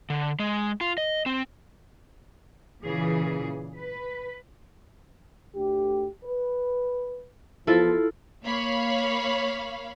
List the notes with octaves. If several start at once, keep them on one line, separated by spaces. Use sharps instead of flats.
D3
G#3
F4
D#5
C4
A#2 C#3 E3 G#4
B4
D2 G4
B4
E2 F3 E4 F4 A4
A#3 C#5 F5 B5